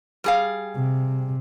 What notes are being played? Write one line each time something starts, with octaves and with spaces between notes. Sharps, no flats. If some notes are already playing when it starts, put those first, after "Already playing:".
G3 G#4 F5
C3